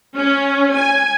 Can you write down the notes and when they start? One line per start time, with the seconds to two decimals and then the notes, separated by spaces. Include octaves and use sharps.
0.16 C#4
0.75 G#5